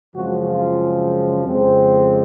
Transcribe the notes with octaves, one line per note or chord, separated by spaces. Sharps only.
F#2 C#3 F3 G#3 C4 F#4
F4
F2 C#3 G#3 C4